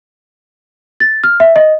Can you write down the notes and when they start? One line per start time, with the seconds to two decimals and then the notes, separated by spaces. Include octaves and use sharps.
1.00 A6
1.24 F6
1.40 E5
1.56 D#5